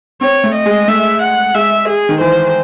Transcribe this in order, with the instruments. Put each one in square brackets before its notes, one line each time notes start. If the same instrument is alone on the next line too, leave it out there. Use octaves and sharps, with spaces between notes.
[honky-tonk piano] C4 [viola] C#5
[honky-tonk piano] A3
[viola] D#5
[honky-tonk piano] G#3
[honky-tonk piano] A3 [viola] E5
[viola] F#5
[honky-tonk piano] G#3 [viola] E5
[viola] G#4
[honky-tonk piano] D#3
[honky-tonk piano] E3 [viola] C5